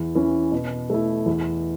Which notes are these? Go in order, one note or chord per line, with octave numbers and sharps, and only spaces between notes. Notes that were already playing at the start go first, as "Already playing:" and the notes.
Already playing: E2
E3 C#4
B2
A3 E4
E2